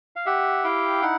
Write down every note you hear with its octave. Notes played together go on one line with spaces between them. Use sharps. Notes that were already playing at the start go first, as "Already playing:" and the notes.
F5
G4 E5 F#5
E4 F5 G5
D#4 F#5